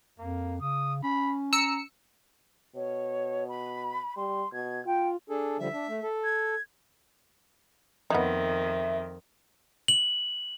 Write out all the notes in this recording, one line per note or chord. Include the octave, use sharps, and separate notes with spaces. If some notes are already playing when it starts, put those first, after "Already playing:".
F2 A#3
C#3 D#6
C#4 B5
A#5 E6 C#7
B2 C#5
B5
G3 C6
B2 G#6
F4 G5
D4 G#4 A4
D3 F3 G3 E5
D4
A3
A4
G#6
F2 D#3 B3 D#4 E5
F#7